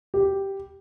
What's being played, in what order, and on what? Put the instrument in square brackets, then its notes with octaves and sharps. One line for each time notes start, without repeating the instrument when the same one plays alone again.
[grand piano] G4